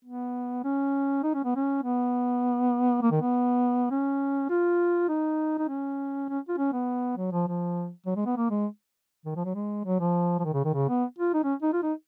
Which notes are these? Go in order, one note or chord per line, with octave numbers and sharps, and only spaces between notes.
B3
C#4
D#4
C#4
B3
C#4
B3
A#3
D#3
B3
C#4
F4
D#4
D#4
C#4
C#4
F4
C#4
B3
F#3
F3
F3
F#3
G#3
B3
A#3
G#3
D#3
F3
F#3
G#3
F#3
F3
F3
D#3
C#3
D#3
C#3
B3
F4
D#4
C#4
D#4
F4
D#4